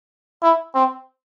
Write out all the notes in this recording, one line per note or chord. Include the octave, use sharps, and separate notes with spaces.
E4
C4